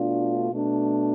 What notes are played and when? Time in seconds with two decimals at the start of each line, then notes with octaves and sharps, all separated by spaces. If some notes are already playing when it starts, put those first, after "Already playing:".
Already playing: B2 A3 D4 F4
0.51 B2 A3 D4